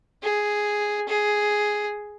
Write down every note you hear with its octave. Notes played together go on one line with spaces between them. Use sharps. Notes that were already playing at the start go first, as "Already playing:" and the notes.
G#4
G#4